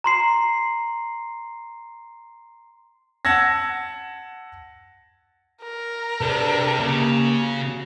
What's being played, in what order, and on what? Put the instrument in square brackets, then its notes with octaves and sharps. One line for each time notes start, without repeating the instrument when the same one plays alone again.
[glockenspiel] A#5 C6 C7
[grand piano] F#5 A5 E6 G#6 A#6
[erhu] A#4
[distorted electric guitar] C3 [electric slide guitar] D4 G#4 B4
[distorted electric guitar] C#3 [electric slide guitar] A#3 G4
[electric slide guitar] F#4